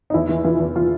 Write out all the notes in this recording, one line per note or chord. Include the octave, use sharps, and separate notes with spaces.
D#4
E2 E4
E3
E3 F4
E2
E3 F4